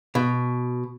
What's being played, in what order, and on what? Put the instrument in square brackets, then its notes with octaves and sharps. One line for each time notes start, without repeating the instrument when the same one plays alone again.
[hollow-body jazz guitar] B2